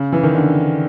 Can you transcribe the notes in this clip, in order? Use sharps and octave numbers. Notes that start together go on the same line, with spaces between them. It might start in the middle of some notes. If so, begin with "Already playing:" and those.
Already playing: C#3
E3
D#3
D3